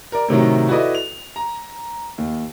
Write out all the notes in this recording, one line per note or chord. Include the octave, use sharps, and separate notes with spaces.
A#4 D5
A2 C3 D#3 F#3
E4 F#4 A4 B4 D5 D#5
F7
A#5
D#2